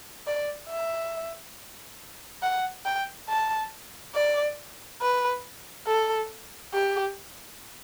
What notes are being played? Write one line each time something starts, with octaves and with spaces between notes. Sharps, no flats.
D5
E5
F#5
G5
A5
D5
B4
A4
G4